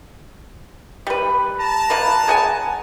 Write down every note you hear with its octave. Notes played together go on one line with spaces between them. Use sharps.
G3 B4
A5 A#5
B2 A#3 B4
G#4 F#5 G#5